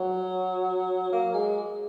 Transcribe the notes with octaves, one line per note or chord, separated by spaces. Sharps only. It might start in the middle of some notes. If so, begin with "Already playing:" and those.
Already playing: F#3
A#3
G#3